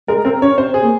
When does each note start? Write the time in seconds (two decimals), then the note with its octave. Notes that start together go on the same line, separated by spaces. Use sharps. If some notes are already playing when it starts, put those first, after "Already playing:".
0.08 G#3 A#4
0.25 C4 A#4
0.42 C#4 C#5
0.58 C4 C5
0.74 G#4
0.83 A#3